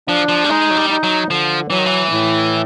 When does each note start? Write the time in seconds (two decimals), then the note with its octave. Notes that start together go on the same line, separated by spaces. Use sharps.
0.08 F3 D4
0.29 F3
0.44 G3
0.49 G#3 D#4
0.71 F#3
0.77 G3
0.90 D#4
1.03 F#3
1.30 D3 F3
1.70 E3 F#3
1.78 D#3
1.86 E3
2.11 A2